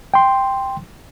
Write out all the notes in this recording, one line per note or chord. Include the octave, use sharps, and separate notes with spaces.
G5 C6